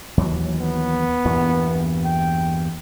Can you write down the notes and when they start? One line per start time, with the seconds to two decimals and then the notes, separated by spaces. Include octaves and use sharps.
0.17 D#2 E3 F#3
0.60 B3
1.25 E2 G2 A#2
2.05 G5